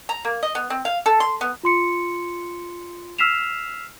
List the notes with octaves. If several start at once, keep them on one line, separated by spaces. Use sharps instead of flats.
A#5
A#3
D#5
B3
C4
F5
A4
C6
B3
F4 C6 C#7
E6 F6 B6 C7 E7 F7